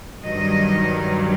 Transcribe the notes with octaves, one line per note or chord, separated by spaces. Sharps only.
G2 D#3 F#3 D#5